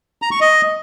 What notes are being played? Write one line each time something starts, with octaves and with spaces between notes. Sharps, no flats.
A#5
C#6
D#5